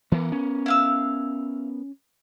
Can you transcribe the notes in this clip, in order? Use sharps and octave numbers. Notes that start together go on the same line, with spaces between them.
E3 B3 A#4
C#4
E4 F5 E6